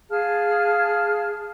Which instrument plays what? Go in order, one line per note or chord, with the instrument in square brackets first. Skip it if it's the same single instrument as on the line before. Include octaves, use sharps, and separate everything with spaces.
[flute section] G#4 F5 A5 F6